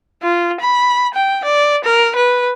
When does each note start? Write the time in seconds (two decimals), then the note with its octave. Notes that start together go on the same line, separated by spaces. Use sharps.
0.23 F4
0.61 B5
1.14 G5
1.45 D5
1.84 A#4
2.16 B4